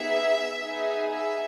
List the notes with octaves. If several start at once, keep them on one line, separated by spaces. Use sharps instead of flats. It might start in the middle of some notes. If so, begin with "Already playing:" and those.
Already playing: B3 D#4 G#4 E5
B3 D#4 G#4
E5